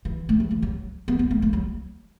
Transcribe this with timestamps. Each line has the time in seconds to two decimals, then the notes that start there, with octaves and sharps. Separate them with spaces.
0.05 E3
0.29 A3
0.40 F#3
0.51 E3
0.62 F#3
1.08 B3
1.19 B3
1.31 A3
1.42 A3
1.53 F#3